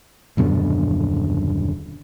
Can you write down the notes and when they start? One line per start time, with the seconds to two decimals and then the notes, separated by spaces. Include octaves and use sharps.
0.37 D#1 F#2 B2 D3